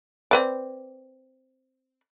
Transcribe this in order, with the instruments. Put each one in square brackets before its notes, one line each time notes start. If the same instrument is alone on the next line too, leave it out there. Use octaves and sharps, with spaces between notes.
[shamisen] C4 B4 D5